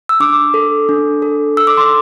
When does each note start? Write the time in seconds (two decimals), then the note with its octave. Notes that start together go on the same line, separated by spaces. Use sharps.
0.09 E6
0.20 D4 D6
0.54 A4
0.89 D4
1.22 A4
1.57 A4 E6
1.67 D6
1.77 C6